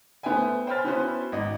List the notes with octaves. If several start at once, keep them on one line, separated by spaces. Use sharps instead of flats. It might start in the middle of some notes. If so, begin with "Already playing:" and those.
A3 B3 C5 E5 G5 G#5
C5 G5 G#5 B5 F6 A6
B3 C#4 E4 F#4 B4 C5
G#1 D#5